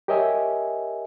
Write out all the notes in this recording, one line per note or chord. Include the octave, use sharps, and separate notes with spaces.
G4 A#4 C#5 D#5 E5 G#5